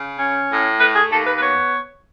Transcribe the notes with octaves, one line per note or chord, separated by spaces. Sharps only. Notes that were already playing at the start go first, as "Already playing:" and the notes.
Already playing: C#3
C#4
A2
A3 B4
G#4
D#2 A4
B4
B4
B3 C#5